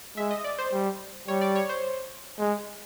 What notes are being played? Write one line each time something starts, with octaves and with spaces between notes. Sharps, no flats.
G#3 E5
D#5
D5
C5
G3
G3 C#5
D5
C#5
C5
G#3